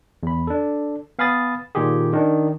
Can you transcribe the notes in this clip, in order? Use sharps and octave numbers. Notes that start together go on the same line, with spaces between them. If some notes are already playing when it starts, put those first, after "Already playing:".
E2 B5
D4 A4
B3 F5 G#5 B5 D#6 A6
A#2 D#3 F4 G4 G#4
D#3 D4